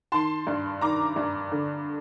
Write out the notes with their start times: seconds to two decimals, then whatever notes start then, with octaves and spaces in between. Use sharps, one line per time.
0.12 D#3 A5 C6
0.47 G2
0.81 D#3 A#5 D6
1.16 G2
1.52 D3